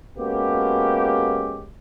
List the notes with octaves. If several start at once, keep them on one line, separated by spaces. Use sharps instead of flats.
G#3 A#3 B3 C#4 F#4 G4